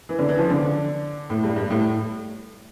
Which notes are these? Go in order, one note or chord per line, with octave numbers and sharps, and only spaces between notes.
E3
D3
E3
F3
D3
A2
G2
G2
A2